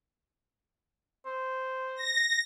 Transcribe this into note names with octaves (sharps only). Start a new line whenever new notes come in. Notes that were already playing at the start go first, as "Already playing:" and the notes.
C5
A#6